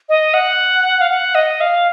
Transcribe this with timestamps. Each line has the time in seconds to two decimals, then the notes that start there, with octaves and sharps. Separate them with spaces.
0.09 D#5
0.34 F#5
1.01 F5
1.10 F#5
1.35 D#5
1.61 F5